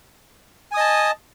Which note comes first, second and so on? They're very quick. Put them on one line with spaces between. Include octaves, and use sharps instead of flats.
G#5 D#6 D#5 A5